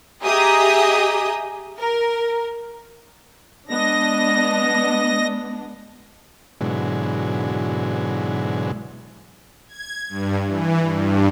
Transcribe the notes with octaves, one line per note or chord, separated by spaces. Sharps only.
G4 G#4 D#5 E5 A#5 D#6
A#4
G#3 B3 D4 D#5 A#6
G#2 B2 D3 E3 F#3 G#3
G#6
G2
E3
G2